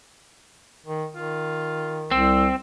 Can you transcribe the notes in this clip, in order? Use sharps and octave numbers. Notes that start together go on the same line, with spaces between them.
D#3
D#3 F4
C2 C4 E6